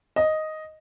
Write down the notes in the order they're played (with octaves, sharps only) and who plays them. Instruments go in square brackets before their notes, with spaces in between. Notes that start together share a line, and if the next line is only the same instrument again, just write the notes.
[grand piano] D#5